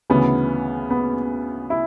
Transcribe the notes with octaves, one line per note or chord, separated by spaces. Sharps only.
D2 C#3 E3 B3
B3
E4